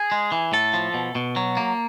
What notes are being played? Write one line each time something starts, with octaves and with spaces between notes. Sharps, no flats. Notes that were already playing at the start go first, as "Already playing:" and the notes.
Already playing: G#4
G#3
E3
A2 A4
F3
B2
B2
F#3
A#3